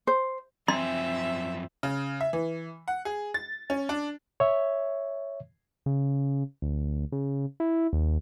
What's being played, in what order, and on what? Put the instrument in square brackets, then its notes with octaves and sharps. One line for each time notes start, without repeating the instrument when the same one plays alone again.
[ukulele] C5
[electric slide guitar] F#2 F3 G#5 [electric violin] C4 [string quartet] E5 [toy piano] C6
[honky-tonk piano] C#3
E5
E3
F#5
G#4
A6
C#4
D4
[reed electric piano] C#5 E5
[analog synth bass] C#3
D2
C#3
E4
D#2